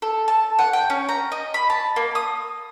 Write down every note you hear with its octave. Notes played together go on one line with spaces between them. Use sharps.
A4
A5
F#5
G5
C#4
A#5
D#5
B5
A5
A#3
D#6